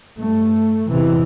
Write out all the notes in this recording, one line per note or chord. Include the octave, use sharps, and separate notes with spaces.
G2 A3
E2 C3 E3